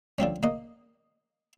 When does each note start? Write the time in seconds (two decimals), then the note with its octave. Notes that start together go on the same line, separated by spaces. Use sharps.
0.19 D3 F3 C4 C#4
0.43 A#3 D#5